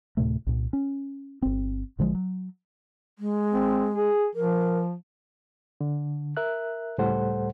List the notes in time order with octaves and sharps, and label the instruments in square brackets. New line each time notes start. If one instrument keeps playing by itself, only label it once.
[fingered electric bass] D2 A2 C3 A3
C2 A#2
C#4
G1 C4
A#1 D3 F3 G#3
F#3
[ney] G#3
[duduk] C4
G#4
[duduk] F3 [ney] A#4
[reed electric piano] D3
A#4 E5 F#6
C#2 A2 G3 A4 C5 F#5